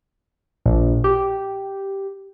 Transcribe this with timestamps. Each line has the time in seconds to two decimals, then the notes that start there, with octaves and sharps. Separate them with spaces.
0.66 A#1
1.04 G4